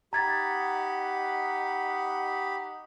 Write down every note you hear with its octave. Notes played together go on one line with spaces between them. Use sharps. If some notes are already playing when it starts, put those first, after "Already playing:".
D#4 G4 D#5 F#5 A#5 B5 G#6 A6